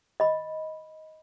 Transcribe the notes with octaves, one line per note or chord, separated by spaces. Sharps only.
D#5 B5